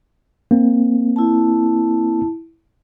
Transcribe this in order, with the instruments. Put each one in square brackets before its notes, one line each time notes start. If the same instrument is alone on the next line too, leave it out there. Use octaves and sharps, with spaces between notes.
[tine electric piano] A#3 C4
[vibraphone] E4 A5